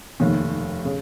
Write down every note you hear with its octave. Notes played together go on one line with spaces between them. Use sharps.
F1 D#2 D#3
C#3